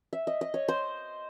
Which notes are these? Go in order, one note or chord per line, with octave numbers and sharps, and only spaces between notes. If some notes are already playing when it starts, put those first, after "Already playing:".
E5
D#5
D#5
C#5
C5